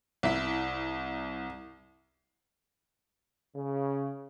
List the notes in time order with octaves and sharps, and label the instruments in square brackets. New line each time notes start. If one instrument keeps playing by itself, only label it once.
[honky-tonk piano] C2 E4 B6
[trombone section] C#3